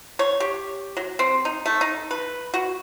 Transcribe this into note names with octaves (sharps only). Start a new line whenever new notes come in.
C#5
G4
F#3
C4
D#4
A3
D#4
B4
F#4